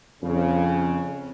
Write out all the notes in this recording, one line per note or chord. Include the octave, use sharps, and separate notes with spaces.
F2 C#3 C#4